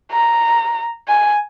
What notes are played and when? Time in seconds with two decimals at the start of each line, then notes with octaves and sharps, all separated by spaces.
0.12 A#5
1.08 G#5